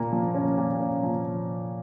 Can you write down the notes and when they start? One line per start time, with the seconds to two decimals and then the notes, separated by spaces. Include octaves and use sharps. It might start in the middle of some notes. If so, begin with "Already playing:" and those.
Already playing: A#2 A#3
0.13 F3
0.35 C#4
0.58 A#2
0.81 C#4
1.03 F3